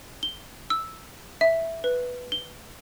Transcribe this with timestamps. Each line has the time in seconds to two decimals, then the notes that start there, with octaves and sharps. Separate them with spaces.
0.23 G7
0.70 E6
1.41 E5
1.84 B4
2.32 G7